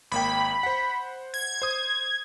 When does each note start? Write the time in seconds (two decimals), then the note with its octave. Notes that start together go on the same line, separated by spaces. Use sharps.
0.12 G#1 A#3 G5 B5
0.63 C5 F#5
1.34 G#6
1.62 C5 D#6